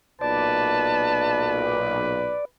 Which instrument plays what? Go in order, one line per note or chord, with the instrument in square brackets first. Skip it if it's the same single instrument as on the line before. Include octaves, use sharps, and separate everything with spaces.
[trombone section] B1 A#2 [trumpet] B4 [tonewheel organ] D5 [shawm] A5